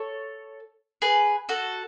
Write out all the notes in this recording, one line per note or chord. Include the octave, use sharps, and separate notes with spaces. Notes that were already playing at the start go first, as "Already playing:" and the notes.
Already playing: A4 C#5
G#4 B4
F#4 A4